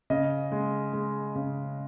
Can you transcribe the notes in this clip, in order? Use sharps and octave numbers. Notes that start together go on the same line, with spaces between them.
C#3 D#5
G#3
G#3
C#3